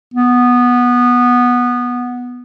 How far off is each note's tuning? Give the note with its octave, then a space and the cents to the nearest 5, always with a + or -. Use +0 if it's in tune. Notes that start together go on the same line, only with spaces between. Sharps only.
B3 -10